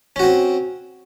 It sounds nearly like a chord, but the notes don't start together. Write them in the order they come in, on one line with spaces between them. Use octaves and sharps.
C#4 F#4 C4